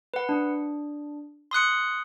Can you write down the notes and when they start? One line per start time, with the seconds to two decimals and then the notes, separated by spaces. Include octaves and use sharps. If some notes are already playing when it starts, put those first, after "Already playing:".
0.14 B4 F#5
0.29 D4
1.51 C6 D#6 F#6 C#7